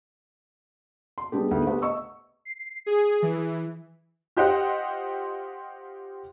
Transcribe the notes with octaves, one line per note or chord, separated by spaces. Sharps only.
C6
G3 G#3 B3 D4 G4
D2 G#2 G#3 B3
A3 B3 G4 C5 F#5
D#5 C#6 E6
C7
G#4
E3
F4 G4 C5 D#5 F#5 G5